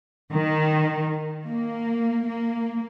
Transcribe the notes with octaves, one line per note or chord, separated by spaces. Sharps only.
D#3
A#3
A#3